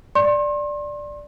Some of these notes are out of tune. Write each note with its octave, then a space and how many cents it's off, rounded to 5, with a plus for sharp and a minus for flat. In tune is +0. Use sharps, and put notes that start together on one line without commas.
D5 +0 C6 +40